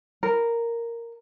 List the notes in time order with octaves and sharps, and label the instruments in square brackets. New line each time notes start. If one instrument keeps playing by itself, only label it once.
[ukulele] A#4